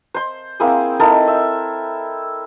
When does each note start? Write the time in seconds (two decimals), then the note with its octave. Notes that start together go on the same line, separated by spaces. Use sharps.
0.14 C5 C6
0.60 A#3 C4 E4 G#4
1.00 D#4 E4 A4 A#4
1.28 E5